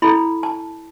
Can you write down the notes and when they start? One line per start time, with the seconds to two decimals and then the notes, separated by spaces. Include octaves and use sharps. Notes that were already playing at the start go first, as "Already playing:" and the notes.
0.02 E4 A4 B5
0.43 A5